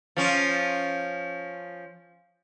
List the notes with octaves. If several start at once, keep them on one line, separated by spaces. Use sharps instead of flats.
F3 C#4